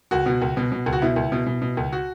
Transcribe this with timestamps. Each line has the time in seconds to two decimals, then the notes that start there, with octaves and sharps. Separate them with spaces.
0.11 C#2 F#4
0.26 B2
0.42 C#2
0.57 B2
0.72 B2
0.86 C#2
0.93 F#4
1.02 B2 E4
1.16 C#2
1.32 B2
1.47 B2
1.62 B2
1.77 C#2
1.93 F#4